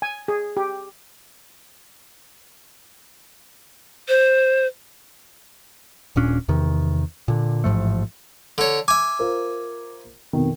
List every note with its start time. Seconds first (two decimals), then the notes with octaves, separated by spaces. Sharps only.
0.02 G#5
0.28 G#4
0.57 G4
4.08 C5
6.16 D#1 A#2 C#4 D4
6.48 E2 C3 D#3
7.28 A#2 D3
7.64 A1 G#2 F3 A3
8.58 D3 C#5
8.88 E5 G#5 D6
9.19 F4 A#4 C5
10.33 F2 B2 D#3